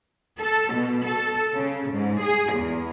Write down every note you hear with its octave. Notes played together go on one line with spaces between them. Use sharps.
A4
B2
A4
C#3
G#2
G#4
E2